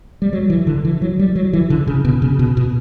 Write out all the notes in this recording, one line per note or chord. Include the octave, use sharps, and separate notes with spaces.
G3
F#3
E3
D3
E3
F#3
G3
F#3
E3
D3
C#3
B2
C#3
B2
B2